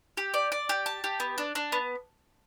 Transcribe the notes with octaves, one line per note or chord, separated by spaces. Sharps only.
G4
D5
D5
G4
A5
G4
B3
D4
D4
B3